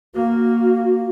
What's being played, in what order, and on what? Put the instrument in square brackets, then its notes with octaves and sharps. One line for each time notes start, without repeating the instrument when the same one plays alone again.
[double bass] A#3 [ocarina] F#4